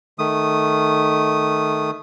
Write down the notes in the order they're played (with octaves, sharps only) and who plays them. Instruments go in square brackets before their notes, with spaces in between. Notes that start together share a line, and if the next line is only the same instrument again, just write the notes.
[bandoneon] D#3 A3 D#6